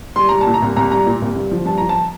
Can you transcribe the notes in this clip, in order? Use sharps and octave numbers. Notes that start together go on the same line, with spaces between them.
G3 C6
G3 A#5
A5
A#2
A#5
C2
C2 A#5
G3 A#5
A#2
C2
G2
F3
G2 A5
F3 A#5
A5